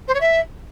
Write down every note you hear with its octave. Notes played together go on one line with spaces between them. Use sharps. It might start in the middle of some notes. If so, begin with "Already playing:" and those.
C5
C#5
E5